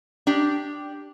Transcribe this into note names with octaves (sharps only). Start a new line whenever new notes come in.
D4 G4